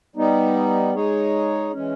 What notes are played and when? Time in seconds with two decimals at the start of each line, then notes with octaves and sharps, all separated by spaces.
0.16 G3 B3 D#4
0.94 G#3 D#4 G#4 C#5
1.72 E3 G#3 C#4